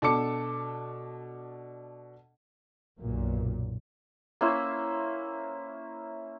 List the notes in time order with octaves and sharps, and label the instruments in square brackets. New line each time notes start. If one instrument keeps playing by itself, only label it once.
[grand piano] B2 D4 A4 A5 D6 C#7
[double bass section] B1 F#2 A#2
[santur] A#3 C#4 E4 C5